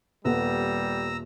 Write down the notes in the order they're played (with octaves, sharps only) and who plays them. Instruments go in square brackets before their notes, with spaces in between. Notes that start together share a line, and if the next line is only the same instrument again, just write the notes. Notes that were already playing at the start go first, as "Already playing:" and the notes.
[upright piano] D#1 [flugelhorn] G3 [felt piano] B3 A4 [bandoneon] A#5 E6